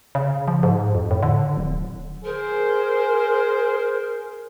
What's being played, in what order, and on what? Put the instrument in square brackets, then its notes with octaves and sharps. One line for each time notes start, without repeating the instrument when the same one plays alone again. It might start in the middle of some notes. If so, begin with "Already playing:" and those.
[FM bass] C#3
F3
G#2
F2
A2
D3
D1
[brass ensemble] G#4 C5 [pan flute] A#4